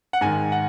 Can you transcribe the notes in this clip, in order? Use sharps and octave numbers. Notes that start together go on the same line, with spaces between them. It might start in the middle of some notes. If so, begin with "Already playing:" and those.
F#5
G#2 D#3 G#5
F#5